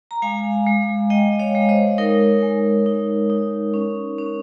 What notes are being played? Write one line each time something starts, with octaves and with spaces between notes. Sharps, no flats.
A#5
G#3 F5 G#5
G#3
G#3 D#5 G5
C#5 F5
G#3
C5 D#5
D#4 A#4 C#5
G#3
D#4
D#4
C#4
C#4